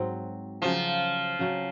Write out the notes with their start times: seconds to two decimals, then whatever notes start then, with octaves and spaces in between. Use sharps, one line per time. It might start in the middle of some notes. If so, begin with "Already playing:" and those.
Already playing: G#2 F#3 C4 F#4
0.62 C#3 F3 F#3 C#4
1.39 C#3 F#3 C#4